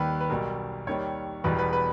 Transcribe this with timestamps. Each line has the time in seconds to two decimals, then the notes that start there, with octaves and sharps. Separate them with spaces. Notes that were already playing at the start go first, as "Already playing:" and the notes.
Already playing: D#2 D#3 G3 B4
0.21 B4
0.29 B1 B2 G3 A#4
0.87 D#2 D#3 G3 C#5
1.44 E1 E2 B2 G3 B4
1.59 B4
1.73 B4